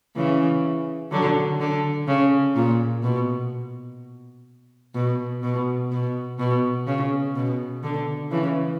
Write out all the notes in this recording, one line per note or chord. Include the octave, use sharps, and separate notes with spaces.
C#3 E3
D3 F#3
D3
C#3
A#2
B2
B2
B2
B2
B2
C#3
B2
D3
C#3 E3